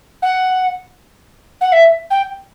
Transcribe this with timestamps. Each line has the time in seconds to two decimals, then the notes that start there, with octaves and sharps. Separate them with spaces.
0.22 F#5
1.61 F#5
1.72 E5
2.10 G5